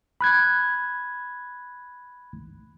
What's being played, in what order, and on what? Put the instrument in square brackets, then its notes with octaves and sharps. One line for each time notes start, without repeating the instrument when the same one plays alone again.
[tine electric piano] B5 F#6 G#6